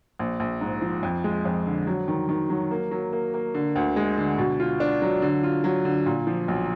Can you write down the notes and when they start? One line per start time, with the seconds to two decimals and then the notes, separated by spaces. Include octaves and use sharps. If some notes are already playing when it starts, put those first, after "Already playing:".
0.19 A#1
0.40 A#1
0.61 G#2
0.82 F3
1.03 F2
1.24 G#3
1.45 F2
1.66 D3
1.87 F#3
2.08 D#3
2.29 D#3
2.50 F#3
2.71 A#3
2.91 F#3
3.13 A#3
3.34 A#3
3.54 D3
3.76 D2
3.96 G#3
4.17 D3
4.38 B2
4.60 F4
4.80 D4
5.02 F#3
5.22 D3
5.43 F4
5.64 F#3
5.85 D3
6.06 A#2
6.27 F3
6.48 B1